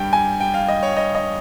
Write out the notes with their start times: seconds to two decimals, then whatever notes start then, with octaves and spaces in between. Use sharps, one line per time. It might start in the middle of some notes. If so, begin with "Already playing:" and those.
Already playing: G2 G3 G5
0.13 G#5
0.41 G5
0.54 F5
0.68 D#5
0.83 C#5
0.97 D#5
1.15 D#5